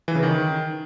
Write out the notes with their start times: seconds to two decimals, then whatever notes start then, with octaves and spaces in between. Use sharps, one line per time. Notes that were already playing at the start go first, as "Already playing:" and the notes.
0.08 E3
0.15 C#3
0.23 D#3